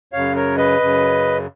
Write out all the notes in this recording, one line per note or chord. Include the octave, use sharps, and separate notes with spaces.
F#2 C#3 C#5 F5
A#4 C#5
B4 D#5
F#2 C#3